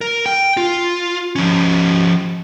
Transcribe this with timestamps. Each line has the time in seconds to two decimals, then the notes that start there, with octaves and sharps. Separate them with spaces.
0.01 A#4
0.26 G5
0.57 F4
1.36 F3 C#4